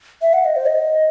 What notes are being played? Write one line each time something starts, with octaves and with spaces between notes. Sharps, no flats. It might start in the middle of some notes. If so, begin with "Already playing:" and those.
E5
F#5
D#5
C5
D#5